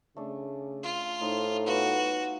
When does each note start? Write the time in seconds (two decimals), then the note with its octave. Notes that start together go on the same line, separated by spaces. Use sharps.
0.17 C#3 A3 D4
0.83 F4
1.21 A2 D#4 C5 D#5
1.66 B3 F4 F#4 B4